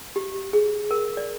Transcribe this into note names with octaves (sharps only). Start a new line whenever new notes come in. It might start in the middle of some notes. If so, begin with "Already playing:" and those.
G4
G#4
A#4
D5